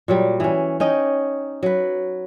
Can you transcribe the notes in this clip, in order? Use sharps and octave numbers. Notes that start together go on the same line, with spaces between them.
A#2 F#3 G3
E3 C#4
C#4 D#4 D#5 G5
F#3 B4